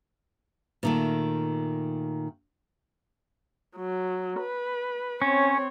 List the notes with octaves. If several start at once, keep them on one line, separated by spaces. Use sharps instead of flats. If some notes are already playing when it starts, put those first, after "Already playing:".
A#2 D#3 A3
F#3
B4
C4 C#4 C#5